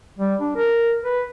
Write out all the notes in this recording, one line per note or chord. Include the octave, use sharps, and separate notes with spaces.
G3
D4
A#4
B4